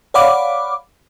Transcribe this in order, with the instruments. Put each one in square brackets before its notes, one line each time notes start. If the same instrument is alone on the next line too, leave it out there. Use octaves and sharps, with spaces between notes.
[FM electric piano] C#5 D5 F5 F#5 B5 D6